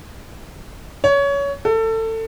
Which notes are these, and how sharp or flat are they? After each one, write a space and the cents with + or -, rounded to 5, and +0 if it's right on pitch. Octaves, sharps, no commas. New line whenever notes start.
C#5 +20
A4 +25